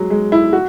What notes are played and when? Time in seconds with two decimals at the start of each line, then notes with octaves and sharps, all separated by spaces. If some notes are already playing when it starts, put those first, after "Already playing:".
Already playing: F#3 G#3
0.10 G#3
0.32 E4
0.53 F#4